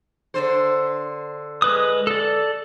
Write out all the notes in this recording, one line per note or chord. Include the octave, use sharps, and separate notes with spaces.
D3 C5
G#3 B4 D#6
A4 D5